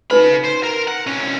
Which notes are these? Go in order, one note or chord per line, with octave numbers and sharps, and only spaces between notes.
C#3 D#4 B4 B5
C5
A#4
F#5
C2 C#4